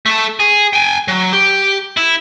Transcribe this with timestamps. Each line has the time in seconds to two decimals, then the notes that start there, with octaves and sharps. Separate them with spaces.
0.06 A3 A4
0.40 G#4
0.73 G5 G#5
1.08 F#3
1.33 G4
1.97 E4